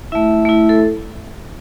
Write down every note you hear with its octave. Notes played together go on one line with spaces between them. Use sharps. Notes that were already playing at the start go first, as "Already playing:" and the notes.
A3 E4 E5
A3 E4
A4